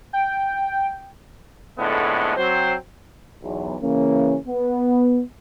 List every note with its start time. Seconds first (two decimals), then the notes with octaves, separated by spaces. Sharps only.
0.13 G5
1.78 F2 A2 D3 G#3 A3 B3
2.37 F#3 C4 C5
3.43 B1 E2
3.82 C#3 E3 A#3 C#4
4.47 B3